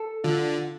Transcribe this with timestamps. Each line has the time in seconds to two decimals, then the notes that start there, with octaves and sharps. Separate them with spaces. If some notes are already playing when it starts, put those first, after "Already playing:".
Already playing: A4
0.24 D3 F4